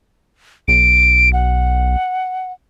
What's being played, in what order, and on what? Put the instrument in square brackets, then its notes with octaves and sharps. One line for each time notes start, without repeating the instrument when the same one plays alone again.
[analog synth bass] B1 [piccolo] D7
[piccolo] F#5